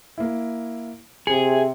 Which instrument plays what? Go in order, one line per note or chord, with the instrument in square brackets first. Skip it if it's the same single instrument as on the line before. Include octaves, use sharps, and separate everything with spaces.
[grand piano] A#3 E4
[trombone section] C3 [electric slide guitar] G#4 [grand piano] C#7